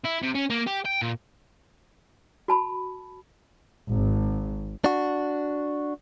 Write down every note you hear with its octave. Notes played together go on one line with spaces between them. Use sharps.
E4
C3
C#4
A#3
G4
G5
A#2
F#4 A5 B5
G#1
D4 F#4